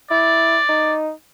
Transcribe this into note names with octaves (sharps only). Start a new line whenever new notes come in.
E4 D5
D#4